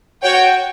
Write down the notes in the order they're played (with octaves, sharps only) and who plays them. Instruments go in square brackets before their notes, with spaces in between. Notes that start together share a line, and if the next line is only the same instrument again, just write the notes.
[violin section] F#4 C#5 G5